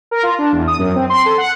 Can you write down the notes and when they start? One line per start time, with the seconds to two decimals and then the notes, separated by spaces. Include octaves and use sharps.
0.11 A#4
0.23 F4
0.38 D4
0.52 E2
0.67 D#6
0.79 F#2
0.96 C4
1.10 C6
1.26 A4
1.38 F#5